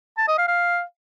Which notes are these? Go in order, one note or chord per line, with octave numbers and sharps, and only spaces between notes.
A5
D#5
F5
F5